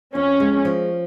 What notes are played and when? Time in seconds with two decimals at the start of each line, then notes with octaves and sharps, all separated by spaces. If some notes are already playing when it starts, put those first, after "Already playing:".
0.14 F2 C#4
0.40 G#3
0.65 F3